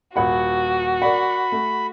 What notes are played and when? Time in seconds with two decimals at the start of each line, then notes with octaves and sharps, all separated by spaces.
0.16 D#1 F#4 F#5 B5
1.02 A#4 D5 F#5 B5
1.52 A3